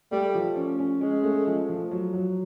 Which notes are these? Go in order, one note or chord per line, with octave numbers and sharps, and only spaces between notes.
G3 A3
F3
C#4
C#4
G#3 C#4
A3
F3
F3
F#3
F#3